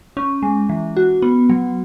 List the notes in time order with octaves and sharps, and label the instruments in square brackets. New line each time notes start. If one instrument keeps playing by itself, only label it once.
[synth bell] C#4
G#3
E3
F#4
B3
F#3